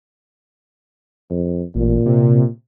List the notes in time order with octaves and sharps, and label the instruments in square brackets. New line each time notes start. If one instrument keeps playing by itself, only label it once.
[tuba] F2
[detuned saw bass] A1 [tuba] A#2
[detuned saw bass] C3